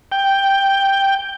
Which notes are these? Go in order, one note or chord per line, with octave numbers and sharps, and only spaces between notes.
G5